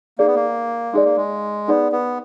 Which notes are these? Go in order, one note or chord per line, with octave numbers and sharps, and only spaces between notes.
A#3 D#4 G#4 D5
B3
A#3
G#3 D#4 G#4 D5
A#3
G#3
B3 D#4 G#4 D5
B3